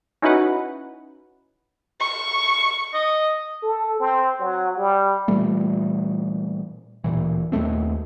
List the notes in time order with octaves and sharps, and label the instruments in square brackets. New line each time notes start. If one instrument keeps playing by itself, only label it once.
[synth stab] C#4 D#4 E4 F#4 B4 F#5
[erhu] C#6
[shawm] D#5
[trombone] A4
C4
F#3
G3
[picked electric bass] A#2 E3 G3 A3
D1 G1 A#2 E3
D#2 G#3 A3 C4